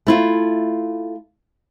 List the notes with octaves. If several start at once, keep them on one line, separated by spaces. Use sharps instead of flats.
A3 E4 F4